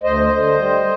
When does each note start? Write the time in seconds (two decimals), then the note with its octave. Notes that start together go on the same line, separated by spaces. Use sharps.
0.03 D2 C5 D#5
0.31 D3
0.57 G3